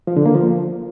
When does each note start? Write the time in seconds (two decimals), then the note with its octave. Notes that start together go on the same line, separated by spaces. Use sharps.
0.07 F3
0.17 D3
0.26 A#3
0.35 F3